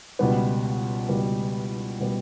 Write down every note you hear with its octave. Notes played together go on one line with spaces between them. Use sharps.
C#2 B2 G3 B3
C#2 B2 G3 B3
B2 G3 B3